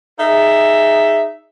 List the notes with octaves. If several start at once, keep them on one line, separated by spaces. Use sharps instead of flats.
D#4 G#4 E5